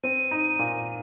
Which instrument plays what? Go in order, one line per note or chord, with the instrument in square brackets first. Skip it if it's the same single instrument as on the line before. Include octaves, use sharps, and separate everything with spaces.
[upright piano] C4 [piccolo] D#7
[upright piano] D#4
A#2